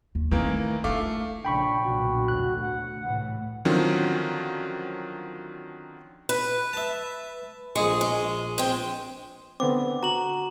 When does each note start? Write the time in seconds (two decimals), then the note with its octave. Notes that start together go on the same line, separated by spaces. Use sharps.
0.15 D#2
0.31 D#3 E3 A3 A#3 C4
0.84 A3 D4 F4 F5 D6
1.45 A#1 C#3 F3 D4 G5 B5 C#6
1.84 B1 A#2 D3 F#4
2.28 E2 A2 D3 F#6
2.60 D2 F#5
3.01 C2 A2 E3
3.65 D3 D#3 F3 F#3 C4 C#4
6.29 B4
6.73 E5 A5
7.76 A#1 G#3 G#4 C#6
8.01 G#3
8.58 G#3 C4
9.60 D3 B3 C4 D6
10.03 F#4 A#5 F#7